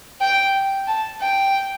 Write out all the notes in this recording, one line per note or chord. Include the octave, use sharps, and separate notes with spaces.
G5
A5
G5